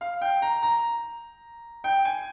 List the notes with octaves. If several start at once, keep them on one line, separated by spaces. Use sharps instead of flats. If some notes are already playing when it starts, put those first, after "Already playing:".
F5
G5
A#5
A#5
G5
G#5